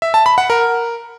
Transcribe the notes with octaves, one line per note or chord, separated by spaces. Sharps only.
E5
A5
B5
F#5
A#4